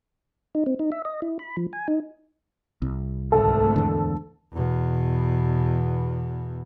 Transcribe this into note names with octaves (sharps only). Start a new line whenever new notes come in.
D#4
C4
D#4
E5
D#5
E4
B5
F3
G#5
D#4
C2
G#1 D2 A3 A4
E2 D3
E2 B2